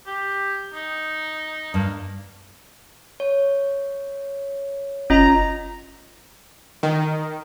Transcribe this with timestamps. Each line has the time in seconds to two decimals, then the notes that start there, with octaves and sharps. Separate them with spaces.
0.07 G4
0.74 D#4
1.74 G2 A#3
3.20 C#5
5.10 F#1 C#4 F4 D#5 A#5
6.83 D#3